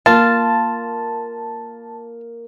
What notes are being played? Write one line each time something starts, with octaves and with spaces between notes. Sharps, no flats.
A#3 F4 A5